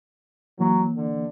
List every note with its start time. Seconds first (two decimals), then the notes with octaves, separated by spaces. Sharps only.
0.59 E3 F#3 A#3
0.96 D3